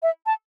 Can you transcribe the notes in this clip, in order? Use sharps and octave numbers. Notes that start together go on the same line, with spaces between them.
E5
A5